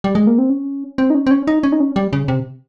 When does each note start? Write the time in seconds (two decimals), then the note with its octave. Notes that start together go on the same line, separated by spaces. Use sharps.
0.04 G3
0.15 G#3
0.27 A#3
0.38 C4
0.50 C#4
0.98 C4
1.10 D#4
1.15 C#4
1.27 C4
1.31 C#4
1.47 D#4
1.63 C#4
1.72 D#4
1.80 C#4
1.96 G3
2.13 C#3
2.28 C3